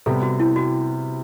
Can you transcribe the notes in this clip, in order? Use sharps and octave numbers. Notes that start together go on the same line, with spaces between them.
C3 G3 B3 A4
F#4
E4
F#4